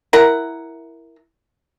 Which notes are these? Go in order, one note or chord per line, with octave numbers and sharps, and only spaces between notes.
E4 A#4 F#5